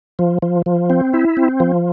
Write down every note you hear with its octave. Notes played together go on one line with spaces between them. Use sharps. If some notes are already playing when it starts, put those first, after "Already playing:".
F3
F3
F3
C4
E4
C4
F3